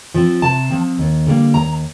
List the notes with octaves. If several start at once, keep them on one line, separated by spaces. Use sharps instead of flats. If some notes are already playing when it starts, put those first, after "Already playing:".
F3 C4
C3 A5
F3 C4
D#2
D3 G3 A#3
D#2 A#5